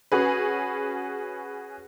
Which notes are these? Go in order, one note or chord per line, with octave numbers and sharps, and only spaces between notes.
C#4 F#4 G#4 B4